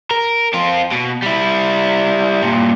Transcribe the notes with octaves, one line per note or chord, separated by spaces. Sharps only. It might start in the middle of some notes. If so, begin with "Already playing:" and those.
A#4
C4 F4
B2
G3 E4
G2 A#2